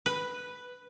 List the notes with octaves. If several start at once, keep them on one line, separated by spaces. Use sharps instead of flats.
B4